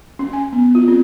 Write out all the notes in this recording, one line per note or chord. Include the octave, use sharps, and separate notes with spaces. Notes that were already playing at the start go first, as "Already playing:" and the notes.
C#4
G#5
B3
F4
C4